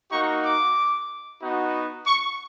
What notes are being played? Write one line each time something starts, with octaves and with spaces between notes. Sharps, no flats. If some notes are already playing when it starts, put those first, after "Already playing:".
A#3 D#4 F#4 C#6
D6
B3 D#4 F#4
C#6